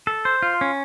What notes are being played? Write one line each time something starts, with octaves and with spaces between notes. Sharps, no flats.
A4
C5
F4
C#4